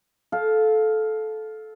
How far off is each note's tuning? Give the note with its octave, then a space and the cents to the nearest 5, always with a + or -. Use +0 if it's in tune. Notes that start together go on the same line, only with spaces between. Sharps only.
A4 -15 F5 +10